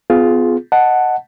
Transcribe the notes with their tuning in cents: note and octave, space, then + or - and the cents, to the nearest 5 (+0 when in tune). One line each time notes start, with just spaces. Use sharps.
B3 +35 F4 +0 G#4 +15
D#5 +0 F#5 +0 A5 +0